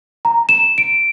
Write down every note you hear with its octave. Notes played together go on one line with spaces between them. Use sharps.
A#5
E7
D7